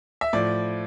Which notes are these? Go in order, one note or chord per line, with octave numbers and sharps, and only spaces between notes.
E5
A2 F3 D5